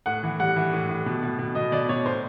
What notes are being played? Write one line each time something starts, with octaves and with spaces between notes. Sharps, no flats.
A2 F#5
E3
G3 F#5
E3
A2
A2
B2
B2
B2
B2 D#5
B2 D5
B2 C#5
A2 C5